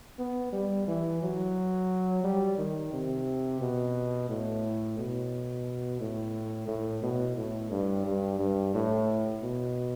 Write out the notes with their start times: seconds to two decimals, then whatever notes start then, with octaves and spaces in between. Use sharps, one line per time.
0.19 B3
0.53 G3
0.87 E3
1.22 F#3
2.24 G3
2.58 D#3
2.93 C3
3.61 B2
4.29 A2
4.98 B2
6.00 A2
6.68 A2
7.03 B2
7.36 A2
7.71 G2
8.06 G2
8.39 G2
8.74 A2
9.42 B2